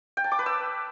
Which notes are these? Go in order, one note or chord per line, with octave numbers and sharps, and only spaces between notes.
G5
A5
D6
B4
E6